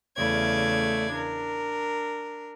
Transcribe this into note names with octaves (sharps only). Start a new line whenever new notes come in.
E2 C#3 A3 D5 G#6
D4 A#4